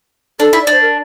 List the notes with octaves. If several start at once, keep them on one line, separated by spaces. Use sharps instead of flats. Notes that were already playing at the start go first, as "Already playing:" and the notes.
D4 A4
E4
D5
D4 C5
A#4